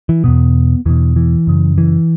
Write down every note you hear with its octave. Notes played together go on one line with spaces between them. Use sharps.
E3
E2 B2 B3
E2 B2 E3
E3
F#2 C#3
E3